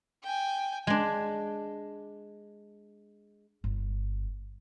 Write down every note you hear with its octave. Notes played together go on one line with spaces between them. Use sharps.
G5 G#5
G#3 D4
G1